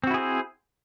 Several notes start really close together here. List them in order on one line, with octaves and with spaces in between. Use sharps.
C4 F#4 E4 G#4 C5